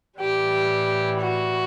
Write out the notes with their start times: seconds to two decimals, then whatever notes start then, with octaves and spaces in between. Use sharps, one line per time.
0.20 A2 E3 G3 G4
1.20 F#4